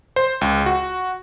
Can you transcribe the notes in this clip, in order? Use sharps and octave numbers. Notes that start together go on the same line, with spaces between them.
C5
C#2
F#4